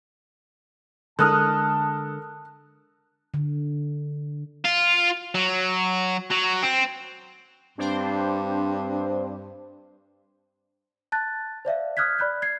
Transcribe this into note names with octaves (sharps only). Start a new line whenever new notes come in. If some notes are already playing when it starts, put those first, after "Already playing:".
D3 G#3 A4 A#4 A5 D#6 F6 F#6
D3
F4
F#3
F#3
C4
G2 C4 D4 C5
A5 F#6 A6
C5 D5 E5 F5
D#6 F6 F#6 G#6 B6
D5 B5 F#6 G6
G#6 C7